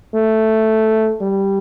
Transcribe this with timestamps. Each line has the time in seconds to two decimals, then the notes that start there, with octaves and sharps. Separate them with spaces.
0.14 A3
1.21 G3